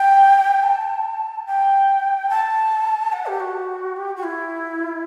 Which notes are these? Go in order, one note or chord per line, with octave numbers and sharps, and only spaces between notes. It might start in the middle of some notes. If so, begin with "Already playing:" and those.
Already playing: G5
A5
G5
A5
F#5
G4
F#4
G4
F#4
E4